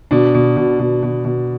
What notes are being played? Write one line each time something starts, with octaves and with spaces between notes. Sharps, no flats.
B2 D4
B2
B2
B2
B2
B2